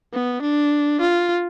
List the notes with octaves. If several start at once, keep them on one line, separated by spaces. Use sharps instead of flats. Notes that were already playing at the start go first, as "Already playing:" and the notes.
B3
D4
F4